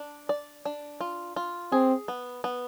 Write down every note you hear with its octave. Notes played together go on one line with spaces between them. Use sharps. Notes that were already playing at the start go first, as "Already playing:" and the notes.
Already playing: D4
D5
D4
F4
F4
C4 G#4
B3
B3